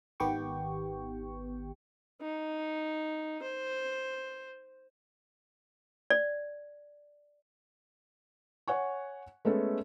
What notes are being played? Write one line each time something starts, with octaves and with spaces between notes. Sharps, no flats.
G#1 D#3 B3 G4 G5 C#6
D#4
C5
D5
C#5 F#5 G#5 C#6
G#3 A3 B3 C#4 A4